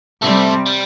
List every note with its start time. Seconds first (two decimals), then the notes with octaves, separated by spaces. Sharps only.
0.22 C3 G3 A3 C4
0.66 G3